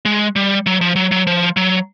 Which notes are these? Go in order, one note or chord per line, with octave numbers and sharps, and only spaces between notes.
G#3
G3
F#3
F3
F#3
F#3
F3
F#3